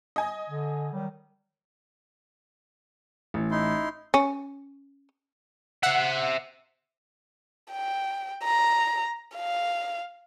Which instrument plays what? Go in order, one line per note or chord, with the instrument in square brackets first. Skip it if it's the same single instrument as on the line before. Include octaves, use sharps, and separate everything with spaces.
[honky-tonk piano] D#5 G#5
[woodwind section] D3
D#3 F#3 G3
[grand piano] A1
[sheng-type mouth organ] D#4 E4 C6
[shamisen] C#4
[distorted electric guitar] C5 E5 [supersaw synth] F#5
[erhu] G5
A#5
F5